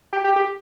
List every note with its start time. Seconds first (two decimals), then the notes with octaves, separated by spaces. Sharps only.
0.13 G4
0.24 G4
0.36 G4